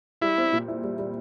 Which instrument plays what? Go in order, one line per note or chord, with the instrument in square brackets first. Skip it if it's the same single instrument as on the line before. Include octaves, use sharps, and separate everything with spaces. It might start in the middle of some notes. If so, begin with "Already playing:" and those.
[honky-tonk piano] G3 [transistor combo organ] E4
[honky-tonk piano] C4
A#2
E4
G3
G3